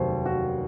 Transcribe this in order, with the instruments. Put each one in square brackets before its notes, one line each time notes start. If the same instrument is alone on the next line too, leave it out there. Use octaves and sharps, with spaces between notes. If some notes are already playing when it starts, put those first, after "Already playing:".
Already playing: [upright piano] F1 D#2 F#3 A#3 C5
F#4